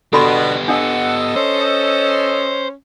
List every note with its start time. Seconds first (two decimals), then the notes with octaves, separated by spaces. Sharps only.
0.13 B2 B3 D4 G4 A4 B5 C6
0.68 D4 A4 D#5 F5 F#5
1.36 C#4 C5